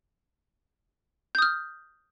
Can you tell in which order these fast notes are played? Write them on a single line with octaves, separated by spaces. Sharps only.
G6 D#6 F6